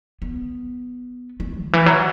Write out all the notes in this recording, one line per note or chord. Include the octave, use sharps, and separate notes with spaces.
B3
A3
D3
E3
F#3